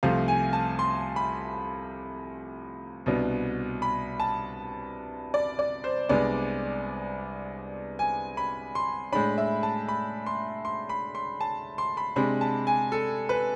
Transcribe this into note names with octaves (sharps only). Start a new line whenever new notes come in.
C2 C3 F3 A3 F5
G#5
A5
C6
B5
C2 B2 B3 D4
B5
A5
D5
D5
C5
C2 C3 G#3 B3 D4 D5
G#5
B5
C6
A2 G#3 D4 B5
E5
A5
B5
C6
C6
B5
C6
A5
C6
B5
C3 G#3 D4 B5
A5
G#5
A4
B4